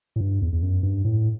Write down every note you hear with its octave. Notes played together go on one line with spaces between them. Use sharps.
A2
G2
E2
E2
F#2
G2
A2